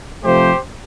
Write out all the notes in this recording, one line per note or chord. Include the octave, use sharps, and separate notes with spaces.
C3 F3 A3 G4 C5